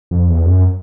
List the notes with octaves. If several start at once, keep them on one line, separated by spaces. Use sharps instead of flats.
F2
E2
F#2